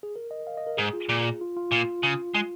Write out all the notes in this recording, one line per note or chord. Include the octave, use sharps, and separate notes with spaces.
G#4
A#4
D#5
F5
D#5
A#4
G#2 G#4
F4
A#2
F4
F4
A#2 F4
C#3
G#3